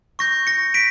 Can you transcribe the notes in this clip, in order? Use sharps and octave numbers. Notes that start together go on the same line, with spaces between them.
C#6 G6 A#6
A#6 C#7
B6 D7